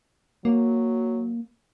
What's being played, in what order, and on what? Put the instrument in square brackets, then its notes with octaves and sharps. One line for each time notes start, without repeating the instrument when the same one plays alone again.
[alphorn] F#3 [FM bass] A#3